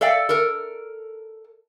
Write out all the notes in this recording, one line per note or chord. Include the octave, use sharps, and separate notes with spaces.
A4 D5 E5 F5 G5
A4 A#4